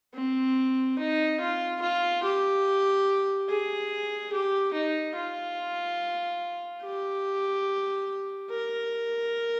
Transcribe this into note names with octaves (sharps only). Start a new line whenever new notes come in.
C4
D#4
F4
F4
G4
G#4
G4
D#4
F4
G4
A#4